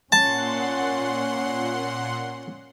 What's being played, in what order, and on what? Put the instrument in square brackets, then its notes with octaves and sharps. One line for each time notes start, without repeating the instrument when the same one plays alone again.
[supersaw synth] A#2 F#5 C6 [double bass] C#4 [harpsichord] A5